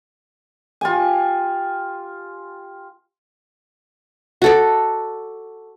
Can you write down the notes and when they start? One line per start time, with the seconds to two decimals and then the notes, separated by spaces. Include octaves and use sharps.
0.81 F4 G4 G#5
4.42 F#4 A4 D5